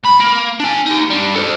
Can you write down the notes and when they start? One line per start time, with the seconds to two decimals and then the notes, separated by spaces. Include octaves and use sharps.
0.04 C#2 B5
0.20 A#3
0.60 D4 G#5
0.86 D#4 G4
1.10 G3 D4
1.36 A4 C5